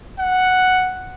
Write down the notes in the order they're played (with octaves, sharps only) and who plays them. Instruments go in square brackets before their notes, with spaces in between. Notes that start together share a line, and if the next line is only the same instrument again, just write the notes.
[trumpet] F#5